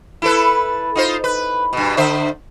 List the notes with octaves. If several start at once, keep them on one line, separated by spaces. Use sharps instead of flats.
E4 A4 B4
D#4 F4 C5
B4
G2 B2
D3 C5 E5